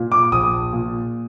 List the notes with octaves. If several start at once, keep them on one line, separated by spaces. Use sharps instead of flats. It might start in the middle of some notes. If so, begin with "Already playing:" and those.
Already playing: A#2
D6
A#1 D#6
A#2